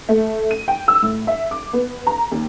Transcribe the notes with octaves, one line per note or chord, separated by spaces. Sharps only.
A3
D#7
G5
E6
A2
E5
D6
B3
A#5
D#2